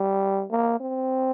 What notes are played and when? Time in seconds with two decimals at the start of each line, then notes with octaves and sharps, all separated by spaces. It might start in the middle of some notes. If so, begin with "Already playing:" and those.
Already playing: G3
0.51 A#3
0.80 C4